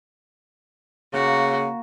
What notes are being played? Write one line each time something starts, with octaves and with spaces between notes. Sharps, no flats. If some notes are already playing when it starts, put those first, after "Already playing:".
C#3 A#3 F#4